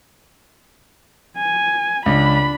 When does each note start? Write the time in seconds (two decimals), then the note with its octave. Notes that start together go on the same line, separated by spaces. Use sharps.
1.37 G#5
2.06 C#2 D4 B5